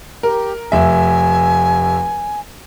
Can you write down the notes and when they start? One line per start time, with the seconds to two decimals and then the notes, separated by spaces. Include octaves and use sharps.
0.23 G4 A#4
0.72 F1 E5 G#5